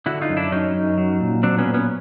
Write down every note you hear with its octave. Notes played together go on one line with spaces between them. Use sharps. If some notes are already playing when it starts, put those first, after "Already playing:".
D3 E4 F#4
D#4 F4
F#2
D4 E4
F#3 C#4 D#4
F#2
F#3
A#2
F#3 C4 D4
B3 C#4
A#2
B3 C#4